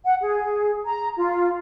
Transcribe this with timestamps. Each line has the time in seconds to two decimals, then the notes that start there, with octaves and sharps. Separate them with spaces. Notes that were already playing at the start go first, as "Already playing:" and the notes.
0.04 F#5
0.20 G#4
0.86 A#5
1.16 F4